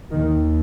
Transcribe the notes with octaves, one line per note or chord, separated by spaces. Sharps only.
D#2 D#3